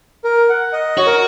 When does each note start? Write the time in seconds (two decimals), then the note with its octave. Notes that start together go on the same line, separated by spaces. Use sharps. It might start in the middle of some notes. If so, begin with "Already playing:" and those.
0.24 A#4
0.49 F#5
0.73 D#5
0.97 F#4 C#5
1.06 A#4